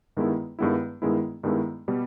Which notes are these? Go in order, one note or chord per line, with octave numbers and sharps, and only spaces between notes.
G2 D#3 G#3 B3 E4
G2 D#3 G#3 B3 E4
G2 D#3 G#3 B3 E4
G2 D#3 G#3 B3 E4
B2 G3